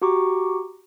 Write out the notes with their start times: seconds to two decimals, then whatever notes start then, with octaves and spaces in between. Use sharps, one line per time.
0.02 F#4 G4 A#5 C#6 D6